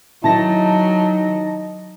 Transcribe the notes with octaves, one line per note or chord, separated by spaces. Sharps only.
D#3 F#3 D#4 E4 A5 A#6